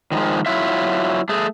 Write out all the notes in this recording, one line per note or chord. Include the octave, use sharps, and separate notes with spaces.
D#3 F3 G3 G#3
F#3 E4 F4 E5
A3 G#4